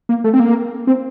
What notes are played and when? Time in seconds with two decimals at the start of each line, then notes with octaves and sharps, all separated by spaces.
0.09 A#3
0.24 A3
0.33 C4
0.40 A#3
0.87 C4